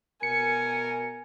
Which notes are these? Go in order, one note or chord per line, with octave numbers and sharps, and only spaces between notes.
B2 A#4 G#5 C#7